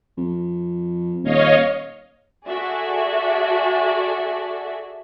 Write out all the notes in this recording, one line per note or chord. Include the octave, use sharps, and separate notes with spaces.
F2
D#1 C#5 D#5 F5
F#4 G#4 A4 D5 E5